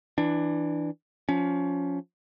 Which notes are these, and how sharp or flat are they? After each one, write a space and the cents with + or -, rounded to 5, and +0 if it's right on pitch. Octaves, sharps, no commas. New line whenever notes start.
E3 +0 D4 +10
F3 +20 C#4 +20